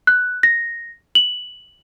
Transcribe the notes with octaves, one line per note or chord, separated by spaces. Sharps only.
F#6
A#6
F#7